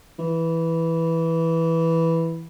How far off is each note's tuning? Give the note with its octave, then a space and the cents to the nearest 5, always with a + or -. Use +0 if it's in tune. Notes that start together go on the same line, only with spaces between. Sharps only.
E3 -5